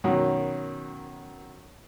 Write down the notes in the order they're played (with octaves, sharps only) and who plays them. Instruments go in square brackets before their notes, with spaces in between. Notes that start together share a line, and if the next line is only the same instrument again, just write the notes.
[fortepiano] F#2 B2 D#3 F#3